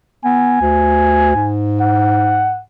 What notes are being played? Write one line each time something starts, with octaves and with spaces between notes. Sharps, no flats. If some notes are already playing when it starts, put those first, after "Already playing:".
B3 G#5
D2
G#2
F#5